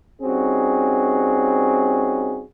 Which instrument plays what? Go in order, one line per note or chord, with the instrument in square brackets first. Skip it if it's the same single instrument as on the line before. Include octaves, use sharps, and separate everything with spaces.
[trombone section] G3 C4 C#4 D#4 F#4 G#4